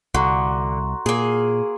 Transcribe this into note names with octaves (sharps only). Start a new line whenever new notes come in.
C2 D3 F#4 A#5 C6
A#2 A#3 G#4